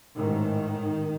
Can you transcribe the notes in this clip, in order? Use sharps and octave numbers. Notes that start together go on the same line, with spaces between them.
A1 G#2 D#3